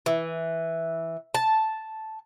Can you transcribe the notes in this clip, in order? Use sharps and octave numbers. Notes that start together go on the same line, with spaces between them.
E3
A5